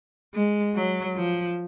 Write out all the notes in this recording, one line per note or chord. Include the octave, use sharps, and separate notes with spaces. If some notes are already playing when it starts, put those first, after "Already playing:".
G#3
F#3
F3